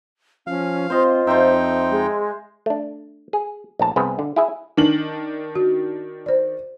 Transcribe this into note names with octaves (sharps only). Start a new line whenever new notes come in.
F3 C#4 F5
C4 F4 C5 D#5
F2 C4 D#4 C5 E5 G5
G#3
A3 D4
G#4
A#1 A2 A5
C2 B3 C4 G#4 B4
D3
E4 G#4 E5
D#3 D4 F#7
F#4
C5 D5